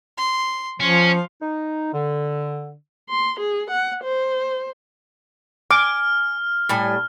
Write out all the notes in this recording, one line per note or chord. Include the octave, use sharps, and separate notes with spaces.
C6
F3 C#4 F4
D#4
D3
C6
G#4
F#5
C5
G#5 D6 F6
A2 G3 G#5